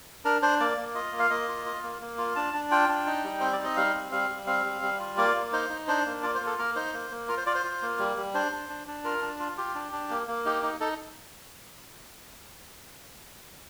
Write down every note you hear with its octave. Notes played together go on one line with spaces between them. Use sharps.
D4 A#4
D4 C5
A#3 D5
A#3
F4 D#5
A#3
F5
A#3 D#5
F4
F4
A#3
A#3
F4
D4 A5
D4
F4 G5
D4
D#4
G3
C4 C5
D5
D#4
D#5
G3 F5
C4
G3 F5
G3
C4 F5
G3
G3
F4
A#3 D5
A#3
D#4 C5
D#4
D4 C5
A#3
F4 D5
C5
A#3
A4
A#3 A#4
D#4 C5
A#3
A#3
F4 A#4
C5
F4 D5
C5
F4
A#3
G3
G3
D4 C5
D4
D4
D4
F4 A#4
D4
F4
F4 G4
D4
D4
A#3
A#3
D#4 G4
D#4
D#4 A4